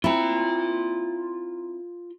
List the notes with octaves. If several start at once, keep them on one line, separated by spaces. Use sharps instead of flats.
C4 E4 F4 A#5